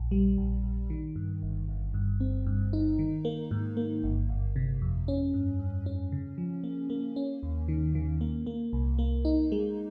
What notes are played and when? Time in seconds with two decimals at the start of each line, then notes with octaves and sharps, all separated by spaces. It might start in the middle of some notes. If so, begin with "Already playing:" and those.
Already playing: A#1
0.11 G3
0.38 A#1
0.64 A#1
0.90 D#3
1.16 G2
1.42 G1
1.68 G1
1.94 G2
2.20 C4
2.46 G2
2.73 D#4
2.99 D#3
3.25 A#3
3.51 G#2
3.77 A#3
4.03 G1
4.29 G1
4.56 C3
4.82 F2
5.08 C#4
5.34 G2
5.59 G2
5.86 C#4
6.12 C#3
6.38 F3
6.64 A#3
6.90 A#3
7.16 C#4
7.43 D#2
7.68 D#3
7.95 D#3
8.21 A#3
8.46 A#3
8.73 C2
8.99 A#3
9.25 D#4
9.52 G#3